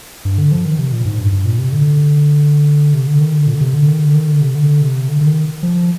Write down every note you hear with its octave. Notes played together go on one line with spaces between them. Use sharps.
G2
D3
F3
D#3
C3
A#2
G#2
G2
G2
A#2
C3
D3
C3
D3
D#3
D3
A#2
D3
C3
D3
D#3
D3
D#3
D3
C3
D3
C3
D3
D3
D#3
F3